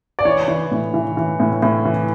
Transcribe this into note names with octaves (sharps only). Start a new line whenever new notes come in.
D5
E3 C#5
E3
A2
E3
E3
A2
A2
E3